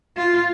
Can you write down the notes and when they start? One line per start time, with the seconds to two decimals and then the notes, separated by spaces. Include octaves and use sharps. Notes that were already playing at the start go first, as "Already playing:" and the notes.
0.17 F4